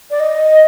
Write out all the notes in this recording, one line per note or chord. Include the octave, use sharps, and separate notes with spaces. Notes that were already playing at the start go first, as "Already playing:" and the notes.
D5
D#5